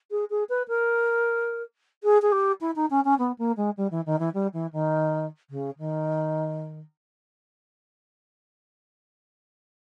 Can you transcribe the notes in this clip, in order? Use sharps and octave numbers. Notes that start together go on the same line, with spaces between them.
G#4
G#4
B4
A#4
G#4
G#4
G4
E4
D#4
C#4
C#4
B3
A#3
G#3
G3
E3
D#3
E3
G3
E3
D#3
C#3
D#3